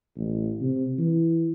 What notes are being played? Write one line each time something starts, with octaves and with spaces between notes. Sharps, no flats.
A1
C3
E3